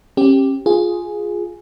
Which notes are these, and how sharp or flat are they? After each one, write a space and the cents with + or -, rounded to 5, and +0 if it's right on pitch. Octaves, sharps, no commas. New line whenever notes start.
C#4 -40 G4 +0
F4 +10 G#4 +0